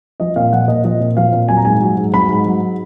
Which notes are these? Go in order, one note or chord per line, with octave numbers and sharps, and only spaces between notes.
F3 D#5
A#2 F5
F3 F#5
A#2 D#5
F3 D#5
A#2
F3 F5
A#2
F#3 G#5
A#5
G#2 G#5
F#3
G#2
F#3 B5
G#2
F#3